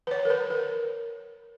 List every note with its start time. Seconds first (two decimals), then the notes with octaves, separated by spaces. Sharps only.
0.07 B4
0.11 C#5
0.25 A#4
0.30 B4
0.50 A#4